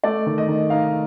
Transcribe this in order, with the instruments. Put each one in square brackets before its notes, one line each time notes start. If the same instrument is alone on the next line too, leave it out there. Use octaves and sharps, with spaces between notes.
[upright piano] A3 D5
D#3
D#5
D#3
D#4 F5